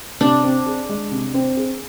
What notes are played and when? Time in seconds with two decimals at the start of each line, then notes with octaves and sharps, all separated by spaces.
0.21 C3 D4
0.44 C4
0.66 G#4
0.89 G#3
1.11 C3
1.34 C4
1.57 G#4